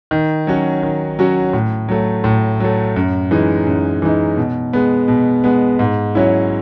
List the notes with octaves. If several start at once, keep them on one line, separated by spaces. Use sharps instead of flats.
D#3
F#3 C#4 F#4
D#3
F#3 C#4 F#4
A2
F#3 A3
A2
F#3 A3
F#2
E3 G#3 D#4
F#2
E3 G#3 D#4
B2
G#3 B3
B2
G#3 B3
G#2
F#3 C#4 E4